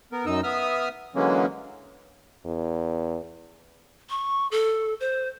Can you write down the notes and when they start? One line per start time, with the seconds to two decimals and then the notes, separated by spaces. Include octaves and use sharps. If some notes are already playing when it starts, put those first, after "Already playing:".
0.12 B3 A#4
0.26 F#2 D#4 D#5 E6
0.43 B3 E5 D#6 F6
1.15 D3 E3 F#3 G#3 A#3 C#4
2.45 E2
4.10 C#6
4.51 A4
5.00 C5